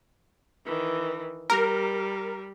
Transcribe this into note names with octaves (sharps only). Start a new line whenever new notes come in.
D#3 E3
G3 A#4